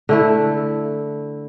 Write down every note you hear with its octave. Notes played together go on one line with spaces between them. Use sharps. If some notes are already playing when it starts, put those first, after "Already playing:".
D3 A3 E4